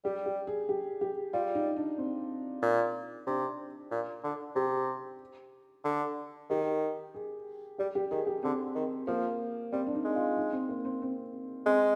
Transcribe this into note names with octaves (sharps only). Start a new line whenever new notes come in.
G3 G4
G4
G#4
G4
G4
G3 F4
D#4
D4
C4
A#2
C3 D4
A#2
D3
C3 G4
D3
D#3 G4
G#4
G3 G4
G4
D#3 G#4
G4
D3 C4
D#3
F3 A#3
G3 C4
D4
D#4
G#3
F4
D#4
C4
A#3
C4
C4
G#3 C4